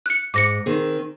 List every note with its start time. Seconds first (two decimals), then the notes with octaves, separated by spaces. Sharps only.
0.06 F#6 C#7
0.34 G#2 D6 A#6 C#7
0.66 D#3 C4 G#4